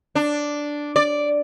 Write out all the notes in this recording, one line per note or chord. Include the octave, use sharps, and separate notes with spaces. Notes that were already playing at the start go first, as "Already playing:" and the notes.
D4
D5